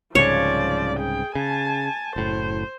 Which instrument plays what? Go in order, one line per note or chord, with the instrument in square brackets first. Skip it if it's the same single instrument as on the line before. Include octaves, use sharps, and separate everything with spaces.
[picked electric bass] C2 G#2 C#3 [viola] F3 D5 [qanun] C#5
[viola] G#4 G5
[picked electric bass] C#3 [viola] G#5 A5
[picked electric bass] F#1 A2 [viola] C5